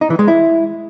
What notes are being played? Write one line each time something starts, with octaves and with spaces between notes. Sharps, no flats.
D#4
E3
G#3
E4